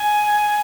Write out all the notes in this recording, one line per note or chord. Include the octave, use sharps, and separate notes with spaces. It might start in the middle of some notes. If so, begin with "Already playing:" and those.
Already playing: G#5